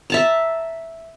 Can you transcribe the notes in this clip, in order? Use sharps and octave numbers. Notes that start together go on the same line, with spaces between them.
E5 A5 A#5